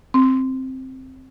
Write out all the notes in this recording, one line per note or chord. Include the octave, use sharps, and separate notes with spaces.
C4